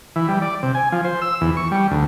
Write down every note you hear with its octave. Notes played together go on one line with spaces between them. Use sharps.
E3
G3
D5
C3
G#5
F3
C5
E6
E2
C#6
G3
D2